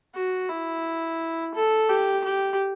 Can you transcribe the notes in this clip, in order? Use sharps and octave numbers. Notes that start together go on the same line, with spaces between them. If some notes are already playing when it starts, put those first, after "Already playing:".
F#4
E4
A4
G4
G4